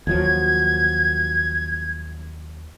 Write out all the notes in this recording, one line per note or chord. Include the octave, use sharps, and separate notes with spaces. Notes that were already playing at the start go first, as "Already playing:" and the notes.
D#2 F3 F#3 G#6